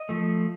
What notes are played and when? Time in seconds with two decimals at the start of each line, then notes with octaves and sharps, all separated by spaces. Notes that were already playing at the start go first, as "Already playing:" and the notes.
Already playing: D#5
0.09 F3 A3